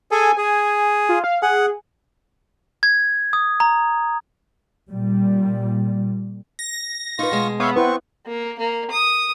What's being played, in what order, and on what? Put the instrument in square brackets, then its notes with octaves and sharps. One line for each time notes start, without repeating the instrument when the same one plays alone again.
[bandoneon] G#4 A4 [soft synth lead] G#5
[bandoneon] G#4
[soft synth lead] F4
F5
[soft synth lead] G#4 [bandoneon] F#5
[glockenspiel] G#6
D#6
A#5
[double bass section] A#2 G3
[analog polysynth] A#6
[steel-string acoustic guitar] D#4 B4 [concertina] F4 C#6
[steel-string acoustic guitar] B2 G#3
[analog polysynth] B3 [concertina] C#5 E5 F5 [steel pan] E6
[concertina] C4 C#6 [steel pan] E4 B4
[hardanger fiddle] A#3
A#3
D#6